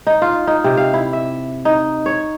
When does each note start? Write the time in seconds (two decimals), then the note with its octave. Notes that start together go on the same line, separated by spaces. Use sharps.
0.07 D#4
0.22 F4
0.47 D#4
0.64 C3
0.77 F5
0.94 E4
1.13 E5
1.65 D#4
2.06 C#5